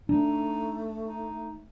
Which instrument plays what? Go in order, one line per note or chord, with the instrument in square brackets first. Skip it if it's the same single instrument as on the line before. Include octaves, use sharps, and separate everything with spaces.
[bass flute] A3 [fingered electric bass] D4 [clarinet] D#4
[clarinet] D#4